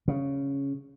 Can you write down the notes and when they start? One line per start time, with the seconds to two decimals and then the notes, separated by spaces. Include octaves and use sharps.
0.08 C#3